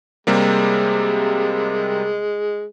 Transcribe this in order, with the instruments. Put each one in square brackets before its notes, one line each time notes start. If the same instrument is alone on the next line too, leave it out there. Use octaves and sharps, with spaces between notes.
[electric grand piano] C3 G3 A#3 [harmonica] G#3